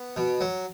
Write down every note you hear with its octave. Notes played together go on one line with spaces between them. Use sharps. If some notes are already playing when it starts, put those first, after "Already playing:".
Already playing: B3
B2
F#3